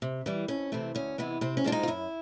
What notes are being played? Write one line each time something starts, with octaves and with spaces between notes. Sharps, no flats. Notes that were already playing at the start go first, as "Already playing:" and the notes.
C3
E3 G3
F2 C#4
C3 E3 A3 C4
D2 C#4
C3 E3 G#3 B3
C3 C4
C#4
F3 G#3 C4 D4
D#4
F4
F#2 E4